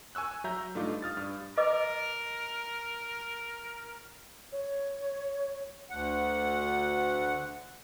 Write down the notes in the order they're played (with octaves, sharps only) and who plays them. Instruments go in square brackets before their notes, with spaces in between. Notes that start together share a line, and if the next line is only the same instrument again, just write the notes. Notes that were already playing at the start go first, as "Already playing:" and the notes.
[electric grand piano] G#5 C#6 E6 F#6
F#3 E5 A#5 G6
G2 A3 D#4 F4 D6
D#6 F6 A6
G2
[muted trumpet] A#4 [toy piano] B4 D#5 D6
[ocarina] C#5
[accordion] D2 F#5